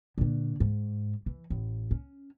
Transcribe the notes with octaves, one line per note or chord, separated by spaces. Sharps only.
A#2 D3
G#2
E3
A1
C#4